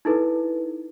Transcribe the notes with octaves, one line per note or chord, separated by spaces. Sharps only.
D#4 E4 A4 B4